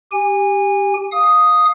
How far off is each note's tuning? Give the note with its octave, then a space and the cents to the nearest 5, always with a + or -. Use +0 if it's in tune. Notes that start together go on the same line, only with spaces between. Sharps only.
G4 +0 G#5 -25
F5 +10 D#6 +0